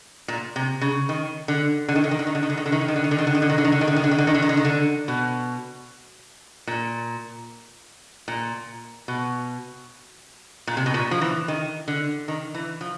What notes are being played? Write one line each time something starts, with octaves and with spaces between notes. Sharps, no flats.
A#2
C3
C#3
D#3
D3
D3
D#3
D3
D#3
D3
D#3
D3
D#3
D3
D#3
D3
D#3
D3
D#3
D3
D#3
D3
D#3
D3
D#3
D3
D#3
D3
D#3
D3
D#3
D3
D#3
D3
D#3
D3
D#3
D3
D#3
D3
D#3
D3
B2
A#2
A#2
B2
A#2
C3
B2
A#2
F3
E3
D#3
D3
D#3
E3
F3